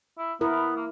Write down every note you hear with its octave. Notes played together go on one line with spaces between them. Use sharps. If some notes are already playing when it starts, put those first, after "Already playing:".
E4
B3 E4 A#4
A#3